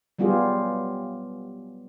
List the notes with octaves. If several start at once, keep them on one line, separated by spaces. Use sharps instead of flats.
F#3 G3 B3 F4 G4 G#4